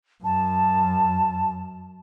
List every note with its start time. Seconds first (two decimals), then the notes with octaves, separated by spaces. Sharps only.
0.24 F#2 A5